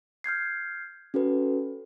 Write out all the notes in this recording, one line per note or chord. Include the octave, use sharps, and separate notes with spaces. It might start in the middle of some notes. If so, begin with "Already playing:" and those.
F6 G6 G#6 C7
C#4 F#4 A4 B4